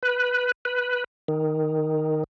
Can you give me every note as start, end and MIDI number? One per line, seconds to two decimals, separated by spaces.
0.03 0.52 71
0.65 1.04 71
1.28 2.24 51